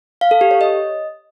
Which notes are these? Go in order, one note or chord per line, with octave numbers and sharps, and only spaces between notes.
F5
A4
G4
C#5
D#5